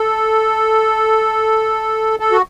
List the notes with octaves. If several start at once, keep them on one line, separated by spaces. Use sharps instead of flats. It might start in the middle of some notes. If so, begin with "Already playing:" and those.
Already playing: A4
A4
F#4